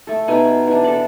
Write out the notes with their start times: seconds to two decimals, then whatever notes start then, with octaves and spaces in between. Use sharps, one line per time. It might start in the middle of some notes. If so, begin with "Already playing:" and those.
0.07 A3 A4
0.28 B2 D#4 G4 G#5
0.67 E3 D4
0.84 A4 D5